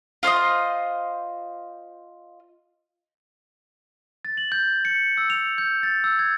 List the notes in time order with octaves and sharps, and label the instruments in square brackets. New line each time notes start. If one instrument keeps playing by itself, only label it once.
[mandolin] F4 C5 C#5 D#5
[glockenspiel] A6
F#7
G6
C#7
E6
F7
G6
A6
E6
G#6